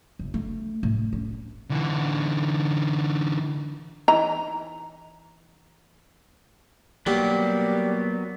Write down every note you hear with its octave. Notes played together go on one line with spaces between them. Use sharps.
F#1
A3
A2
C#4
D3 E3
E3 D#4 A#5
F#3 G3 A#3 B3 G4